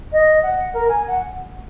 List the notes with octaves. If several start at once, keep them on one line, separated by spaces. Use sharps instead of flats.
D#5
F#5
A#4
G#5
F#5